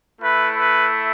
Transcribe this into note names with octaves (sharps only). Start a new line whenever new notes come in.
A3 E4 B4
B4